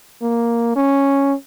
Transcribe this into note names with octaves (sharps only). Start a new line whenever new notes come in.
A#3
C#4